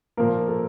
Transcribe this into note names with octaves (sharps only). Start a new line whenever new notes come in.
A#2 F3 A#3 A#4
A4